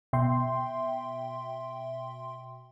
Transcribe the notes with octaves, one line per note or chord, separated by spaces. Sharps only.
B2 E5 G5 C6